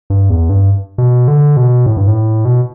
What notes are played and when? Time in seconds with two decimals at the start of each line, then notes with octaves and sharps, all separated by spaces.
0.10 G2
0.30 E2
0.49 G2
0.98 B2
1.28 D3
1.57 B2
1.86 A2
1.97 G2
2.08 A2
2.45 B2